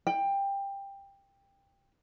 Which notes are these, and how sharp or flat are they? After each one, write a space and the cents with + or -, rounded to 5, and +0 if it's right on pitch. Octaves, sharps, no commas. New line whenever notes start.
G5 +15